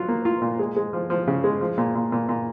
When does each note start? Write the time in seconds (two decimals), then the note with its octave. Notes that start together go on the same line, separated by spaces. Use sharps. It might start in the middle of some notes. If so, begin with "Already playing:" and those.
Already playing: F#3 F4
0.08 A#3
0.25 F4
0.42 A#2
0.59 G#3
0.76 G#3
0.93 F3
1.10 F3
1.27 C#3
1.44 G#3
1.61 F3
1.77 A#2
1.95 A#2
2.12 A#2
2.29 A#2